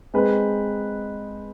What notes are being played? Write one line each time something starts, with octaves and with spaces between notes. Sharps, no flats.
G#3 C4 D#4 B4